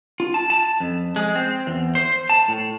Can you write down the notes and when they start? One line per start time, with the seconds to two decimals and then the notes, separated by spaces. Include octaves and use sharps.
0.20 F4
0.34 A5
0.50 A5
0.80 F2
1.16 G#3
1.35 C4
1.67 E2
1.95 C5
2.29 A5
2.48 A2